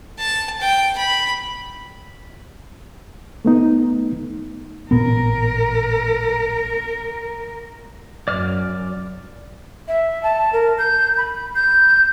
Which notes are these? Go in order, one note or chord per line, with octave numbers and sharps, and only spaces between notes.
A5
G5
B5
A3 B3 D#4
A1 A#2 B3 A#4
F#2 D5 F6
E5
A5
A#4
G6
B5
G6